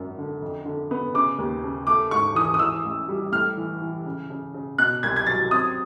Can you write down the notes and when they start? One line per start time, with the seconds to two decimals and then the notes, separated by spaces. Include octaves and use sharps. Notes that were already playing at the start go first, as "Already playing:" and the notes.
Already playing: G#1 F#2
0.18 D3
0.42 F2
0.65 D3
0.91 B3
1.14 C#3 D6
1.38 D#2
1.63 C#3
1.87 A3 D6
2.11 G#2 C#6
2.35 E3 D#6
2.54 D#6
2.59 E3 E6
2.85 A1
3.09 G3
3.32 A2 F6
3.57 E3
3.81 E3
4.06 C#3
4.30 C#3
4.54 C#3
4.78 B2 F#6
5.03 C2 G#6
5.16 G#6
5.26 F#3 A6
5.51 C4 D#6